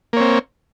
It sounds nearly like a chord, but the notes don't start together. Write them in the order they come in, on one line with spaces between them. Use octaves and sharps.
A#3 C#5 C4